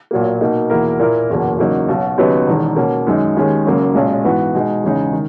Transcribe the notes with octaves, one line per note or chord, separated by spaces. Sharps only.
B1 A#2 F#3 A#3
B2 A#3 D#4
E2 B2 A#3 E4 A#4
A#2 A#3 E4 A#4
F#1 E2 B2 A#3
E2 C#3 F#3 A#3 D#4
B1 B2 F#3
D#2 C#3 F#3 B3 D#4
E1 E2 D#3
B2 A#3 C#4
F#2 D#3 G#3 D#4
D#2 D#3 G#3 C#4 G#4
F#1 F#2 C#3 F#3 A#3
B1 A#2 G#3 C#4
G#2 E3 B3 F#4
B2 G#3 D#4
E2 C#3 G#3 D#4
D#3